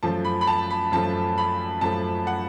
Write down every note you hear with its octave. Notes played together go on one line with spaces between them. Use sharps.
F#2 F3 A3 A5
B5
B5
A5
B5
F#2 F3 A3 A5
B5
F#2 F3 A3 A5
F#5